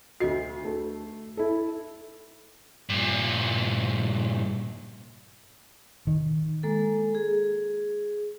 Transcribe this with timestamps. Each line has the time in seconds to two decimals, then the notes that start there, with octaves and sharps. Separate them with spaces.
0.20 D2 F#4 D#5 C7
0.65 A3
1.37 E4 A4
2.89 G2 A#2
6.07 D#3
6.63 G#3 A#3 A4
7.15 G#4